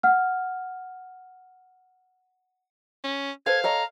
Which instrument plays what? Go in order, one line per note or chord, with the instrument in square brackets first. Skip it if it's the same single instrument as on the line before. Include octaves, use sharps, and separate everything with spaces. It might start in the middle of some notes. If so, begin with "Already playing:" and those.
[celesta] F#5 F6
[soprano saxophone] C#4
[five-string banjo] A4 B4 C5 [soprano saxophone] F5 [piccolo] G#6
[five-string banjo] A4 C#5 D#5 [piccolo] A#5